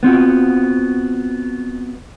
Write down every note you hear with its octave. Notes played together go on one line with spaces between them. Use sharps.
B3 C4 F4 F#4